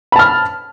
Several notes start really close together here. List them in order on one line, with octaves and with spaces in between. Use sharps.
B5 A5 F6